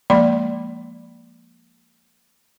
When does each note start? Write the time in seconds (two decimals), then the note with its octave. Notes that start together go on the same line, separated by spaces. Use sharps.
0.10 F3 G#3 A#3 D5 B5 C6